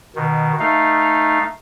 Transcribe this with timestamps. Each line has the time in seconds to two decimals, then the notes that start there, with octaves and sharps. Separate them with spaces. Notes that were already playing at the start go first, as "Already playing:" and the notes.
0.16 B2 D#3
0.59 A3 D#4 F5